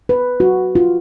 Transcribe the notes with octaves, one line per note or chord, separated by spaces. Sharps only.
B4
F#4
F4